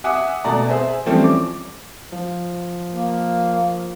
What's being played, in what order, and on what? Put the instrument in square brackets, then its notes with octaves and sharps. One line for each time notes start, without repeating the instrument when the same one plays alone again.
[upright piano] E5 F#5 G#5 D6 D#6
B2 A3 D5 A#5
G#4 C5 E5 G#5
E3 F3 G3 A3 C4 C#4
D6
[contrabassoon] F3
[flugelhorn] A#3